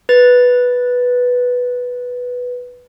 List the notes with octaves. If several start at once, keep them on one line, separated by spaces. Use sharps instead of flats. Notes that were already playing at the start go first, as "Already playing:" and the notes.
B4 A6